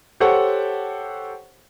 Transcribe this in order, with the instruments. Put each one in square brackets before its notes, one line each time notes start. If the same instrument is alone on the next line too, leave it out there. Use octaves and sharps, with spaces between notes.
[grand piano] G4 A4 C5 C#5 F#5 C#6